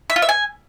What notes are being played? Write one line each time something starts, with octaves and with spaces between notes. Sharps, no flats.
E5
F4
E5
G#5